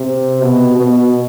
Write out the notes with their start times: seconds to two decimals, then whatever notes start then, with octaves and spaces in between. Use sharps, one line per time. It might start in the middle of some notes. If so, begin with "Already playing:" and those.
Already playing: C3
0.41 B2
0.77 B2